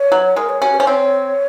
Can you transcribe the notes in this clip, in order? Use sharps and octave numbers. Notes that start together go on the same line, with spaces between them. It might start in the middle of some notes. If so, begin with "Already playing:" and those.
Already playing: C#5
F#3
G#3 A#4
C#5
C#4 F#4
C5
C#4
C4 C#5